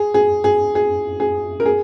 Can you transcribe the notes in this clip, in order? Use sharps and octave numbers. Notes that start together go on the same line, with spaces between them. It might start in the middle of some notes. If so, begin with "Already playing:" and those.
Already playing: G#4
G#4
G#4
G#4
G#4
A#4
G#4